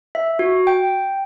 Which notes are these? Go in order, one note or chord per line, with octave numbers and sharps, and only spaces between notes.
E5
F#4
G5